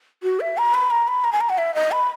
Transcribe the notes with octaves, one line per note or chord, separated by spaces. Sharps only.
F#4
E5
A#5
B5
A#5
B5
A#5
G#5
A#5
F#5
E5
D#5
B5